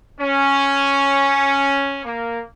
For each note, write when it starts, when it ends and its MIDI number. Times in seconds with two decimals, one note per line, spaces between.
0.20 2.00 61
2.05 2.41 58